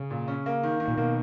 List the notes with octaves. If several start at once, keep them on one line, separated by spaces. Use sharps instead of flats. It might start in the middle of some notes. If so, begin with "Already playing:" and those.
Already playing: C#3
A#2
C#4
A#3
D#3
D#3
A#2
B2 A#3